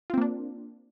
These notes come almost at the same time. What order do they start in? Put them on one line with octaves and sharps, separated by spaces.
F4 C4 A#3 D4